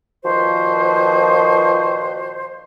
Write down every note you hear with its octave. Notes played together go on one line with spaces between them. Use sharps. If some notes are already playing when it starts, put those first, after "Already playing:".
A#2 D#3 F3 F#4 B4 C5